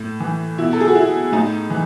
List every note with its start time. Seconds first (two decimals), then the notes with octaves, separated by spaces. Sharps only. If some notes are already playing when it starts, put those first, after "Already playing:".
Already playing: A2
0.20 E3
0.58 B2 E4
0.73 A4
0.80 G#4
0.88 F#4
0.95 E4
1.32 A2 D#4
1.70 E3